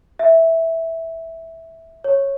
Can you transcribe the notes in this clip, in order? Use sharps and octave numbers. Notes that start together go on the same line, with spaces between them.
E5
C#5